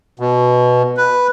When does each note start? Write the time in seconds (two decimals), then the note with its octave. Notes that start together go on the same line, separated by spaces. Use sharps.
0.20 B2
0.97 B4